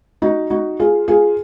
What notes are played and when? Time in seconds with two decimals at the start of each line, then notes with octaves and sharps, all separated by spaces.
0.22 D#4 F#4
0.50 D#4 F#4
0.80 F4 G#4
1.08 F4 G#4